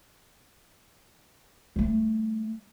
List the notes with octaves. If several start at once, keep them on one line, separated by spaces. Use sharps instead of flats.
G3 A3